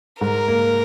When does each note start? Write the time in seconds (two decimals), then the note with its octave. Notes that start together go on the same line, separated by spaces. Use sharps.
0.21 G#2 A#4
0.48 A#3